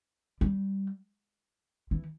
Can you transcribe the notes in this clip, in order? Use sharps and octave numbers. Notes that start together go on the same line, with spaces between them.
G3
E3